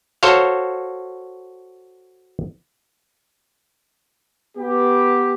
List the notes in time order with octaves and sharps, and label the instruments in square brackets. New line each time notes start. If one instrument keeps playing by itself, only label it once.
[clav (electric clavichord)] F#4 A4 C5 C#5 F5
[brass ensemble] B3 G4